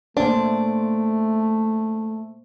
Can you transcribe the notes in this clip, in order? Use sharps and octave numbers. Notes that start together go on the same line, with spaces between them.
A3 A#3 D4 C5